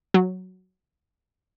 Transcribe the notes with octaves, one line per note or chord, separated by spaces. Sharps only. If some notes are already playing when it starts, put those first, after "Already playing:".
F#3